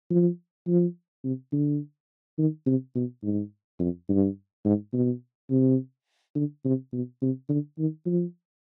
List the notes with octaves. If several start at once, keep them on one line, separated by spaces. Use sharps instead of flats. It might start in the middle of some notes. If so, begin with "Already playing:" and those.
F3
F3
C3
D3
D#3
C3
B2
G#2
F2
G2
G#2
B2
C3
D3
C3
B2
C3
D3
D#3
F3